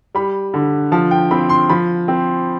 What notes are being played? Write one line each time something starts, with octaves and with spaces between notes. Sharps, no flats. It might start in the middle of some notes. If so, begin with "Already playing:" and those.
G3 B5
D3
F3 A5
G5
C4 B5
C6
F3 B5
C4